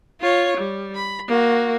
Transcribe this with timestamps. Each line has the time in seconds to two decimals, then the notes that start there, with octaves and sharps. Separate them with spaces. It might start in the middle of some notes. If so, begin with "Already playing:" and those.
0.20 F4 C#5
0.57 G3
0.95 B5
1.28 A#3 F#4